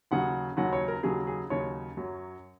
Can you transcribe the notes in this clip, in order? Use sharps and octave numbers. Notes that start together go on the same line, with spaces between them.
D#2 C#3 F#3 F#5
D#2 C#3 F#3 F#5
C#5
A#4
D#2 C#3 F#3 G#4
G#4
D#2 C#3 F#3 C#5
F#2 F#3